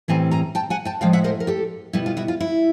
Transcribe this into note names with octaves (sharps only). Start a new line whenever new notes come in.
A2 E3 G3 C4 G#5 A#5
G#5 A#5
G5 A5
F#5 G#5
G5 A5
A2 F3 G#3 F5 G5
E5 F#5
A#4 C5
A#4
G4 A4
B2 G3 B3 E4
F4
E4 F#4
F4
E4